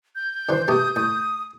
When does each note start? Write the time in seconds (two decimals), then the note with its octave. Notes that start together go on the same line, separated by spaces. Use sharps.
0.15 G6
0.49 D3 E3 C5
0.68 B2 A3 G4 D#6
0.96 A2 D#6